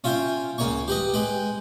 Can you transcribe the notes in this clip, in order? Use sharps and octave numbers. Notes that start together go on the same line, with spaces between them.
C#4 F4 E5 G5
C#2 A#3 C#5 G#5 C#6
G4 B4 D#5
G#3 B4 G5